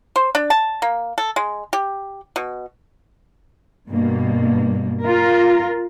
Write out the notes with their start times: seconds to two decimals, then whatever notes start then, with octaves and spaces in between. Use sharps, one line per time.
0.16 C5
0.35 D4
0.50 A5
0.82 A#3
1.18 A4
1.36 G#3
1.73 G4
2.36 B2
3.89 G2 B2 A#3
5.04 F4 A#4